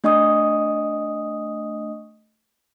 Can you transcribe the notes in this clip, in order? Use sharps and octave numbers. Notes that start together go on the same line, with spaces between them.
A3 D4 D#5 C#6 D#6